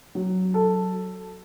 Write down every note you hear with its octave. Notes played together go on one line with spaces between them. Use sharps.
F#3
A4